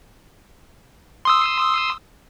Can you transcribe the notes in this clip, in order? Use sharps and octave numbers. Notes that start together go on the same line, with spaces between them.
C6 D#6 E6